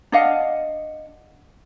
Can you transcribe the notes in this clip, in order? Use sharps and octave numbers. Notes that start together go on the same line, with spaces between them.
D4 D#5 F5 F#5